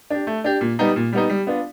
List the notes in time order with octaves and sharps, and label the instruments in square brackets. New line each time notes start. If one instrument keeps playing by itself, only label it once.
[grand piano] D4 G4
A3
D4 G4
A#2
G3 B3 D#4
A#2
G3 B3 D#4
G3
B3 D4 F4